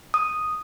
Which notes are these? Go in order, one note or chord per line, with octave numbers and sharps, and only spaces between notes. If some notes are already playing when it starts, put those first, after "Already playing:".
D#6